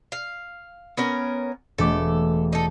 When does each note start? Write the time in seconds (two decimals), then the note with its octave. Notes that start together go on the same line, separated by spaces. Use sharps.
0.12 F5
0.97 B3 C#4 A#4
1.78 E1 A3 A4 D6
2.53 D#4 A4